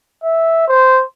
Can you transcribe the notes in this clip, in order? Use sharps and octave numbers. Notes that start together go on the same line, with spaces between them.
E5
C5